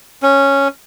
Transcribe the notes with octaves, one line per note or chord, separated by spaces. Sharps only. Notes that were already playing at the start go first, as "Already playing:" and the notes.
C#4